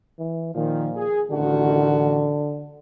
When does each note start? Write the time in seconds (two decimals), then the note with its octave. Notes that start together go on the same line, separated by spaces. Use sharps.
0.19 E3
0.55 A#2 D#3 F3
0.95 G#4
1.31 A1 D3 D#3 F#4